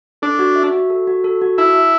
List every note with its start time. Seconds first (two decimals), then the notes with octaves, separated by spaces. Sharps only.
0.22 D4 A4
0.39 F#4
0.56 E5
0.73 F#4
0.90 A4
1.07 F#4
1.24 A4
1.42 F#4
1.58 E4 A5
1.75 E5